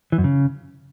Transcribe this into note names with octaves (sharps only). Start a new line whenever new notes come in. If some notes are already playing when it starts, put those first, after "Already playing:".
E3
F#2
C#3